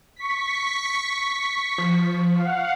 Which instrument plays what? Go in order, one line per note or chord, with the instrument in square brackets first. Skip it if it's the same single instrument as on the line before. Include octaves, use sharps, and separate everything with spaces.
[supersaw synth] C#6 B6
[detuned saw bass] F3
[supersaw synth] F5 F#5